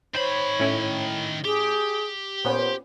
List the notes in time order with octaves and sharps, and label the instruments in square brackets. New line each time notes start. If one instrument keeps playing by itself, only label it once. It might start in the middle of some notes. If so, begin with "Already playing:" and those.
[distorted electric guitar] D#3 B5 [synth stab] C5 [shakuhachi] C#5
[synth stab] A2 C#4 E4
[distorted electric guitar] G4 [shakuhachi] G#4
[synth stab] A#2 B3 C#4 [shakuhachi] C5